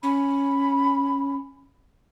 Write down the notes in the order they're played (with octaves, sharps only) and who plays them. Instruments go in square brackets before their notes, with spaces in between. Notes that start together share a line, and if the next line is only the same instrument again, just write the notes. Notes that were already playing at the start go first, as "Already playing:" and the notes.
[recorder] C#4 [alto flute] B5